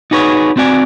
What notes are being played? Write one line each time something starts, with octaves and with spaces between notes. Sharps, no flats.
D#4 F#4 G#4 B4 C#5
C4 F#4 D5 G#5